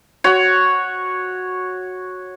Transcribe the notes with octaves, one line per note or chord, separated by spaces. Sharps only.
F#4 C#5